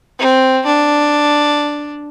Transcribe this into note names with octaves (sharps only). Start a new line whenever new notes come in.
C4
D4